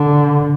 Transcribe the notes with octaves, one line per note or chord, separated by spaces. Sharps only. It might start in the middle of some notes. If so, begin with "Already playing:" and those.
Already playing: D3